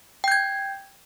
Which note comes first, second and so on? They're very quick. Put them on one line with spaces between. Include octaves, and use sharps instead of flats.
G5 G6 G#6